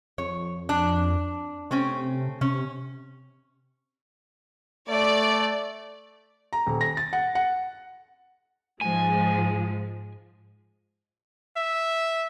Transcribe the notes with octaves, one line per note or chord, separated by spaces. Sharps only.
F2 C#5
D4
C3 A3 C4 C#4
C3 C#4
A3 D5
A#5
D#1
A#6
A6
F#5
F#5
G#2 F3 G#3 G#5
E5